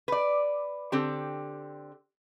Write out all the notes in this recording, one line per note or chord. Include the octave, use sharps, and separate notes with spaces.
B4 D5
D3 C4 G4